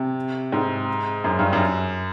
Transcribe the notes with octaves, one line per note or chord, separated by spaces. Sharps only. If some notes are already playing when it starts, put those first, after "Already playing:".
Already playing: C3
G#2
F#2
G2
F#2